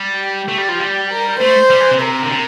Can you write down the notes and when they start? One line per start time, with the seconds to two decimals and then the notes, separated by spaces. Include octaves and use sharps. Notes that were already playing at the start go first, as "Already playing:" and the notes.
Already playing: G3
0.18 G4
0.48 A3
0.58 G3
0.68 F3
0.79 G3
1.10 A#4
1.39 A3 C5
1.70 G3
1.81 E3
1.91 C3
2.01 A#4
2.23 D3
2.32 C3